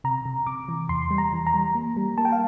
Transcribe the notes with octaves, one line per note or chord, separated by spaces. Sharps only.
C3 A#5
C3
C3 D6
E3
E2 C6
G3
A#5
E3
A#5
G3
A#3
G3
A#3 A5
G5
F5